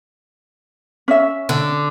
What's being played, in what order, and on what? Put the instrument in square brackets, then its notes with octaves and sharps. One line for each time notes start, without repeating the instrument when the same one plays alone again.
[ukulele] C#4 E5
[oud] D3